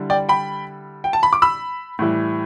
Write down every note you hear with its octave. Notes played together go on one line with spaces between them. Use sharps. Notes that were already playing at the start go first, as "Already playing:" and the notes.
Already playing: D3 G3 E4
D5 G5
G5 B5
G5
A5
B5
D6
B5 E6
A2 E3 G3 E4